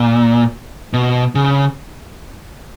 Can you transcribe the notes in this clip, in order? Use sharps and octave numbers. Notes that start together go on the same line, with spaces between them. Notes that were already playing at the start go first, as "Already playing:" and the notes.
Already playing: A#2
B2
C#3